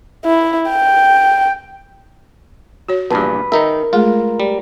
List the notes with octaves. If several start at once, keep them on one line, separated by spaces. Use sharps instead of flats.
E4
G5
F#4 C#5
A#1 E2 G2 B4 A5
D#3 D#4 A#4 E5
G#3 A3 F4 G#4
G3